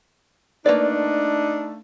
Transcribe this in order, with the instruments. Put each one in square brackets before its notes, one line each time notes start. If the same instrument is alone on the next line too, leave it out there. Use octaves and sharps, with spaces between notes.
[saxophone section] A3 D4 D#4 [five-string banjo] A#3 B4 D5